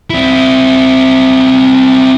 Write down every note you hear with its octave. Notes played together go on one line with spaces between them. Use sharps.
C4 E4